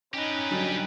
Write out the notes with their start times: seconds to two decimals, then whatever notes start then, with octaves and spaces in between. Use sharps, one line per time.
0.14 C#4 D#4 G4 B4
0.51 D3 F#3 G3